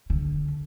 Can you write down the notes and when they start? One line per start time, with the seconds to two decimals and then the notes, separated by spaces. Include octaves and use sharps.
0.10 D3